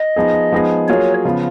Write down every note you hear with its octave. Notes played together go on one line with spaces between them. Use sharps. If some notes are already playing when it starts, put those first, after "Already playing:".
Already playing: D#5
F3 B3 D#4 G#4
F3 G#3 B3 D#4 G#4
F#3 A#3 F4 G#4 C#5
C#3 F3 B3 F4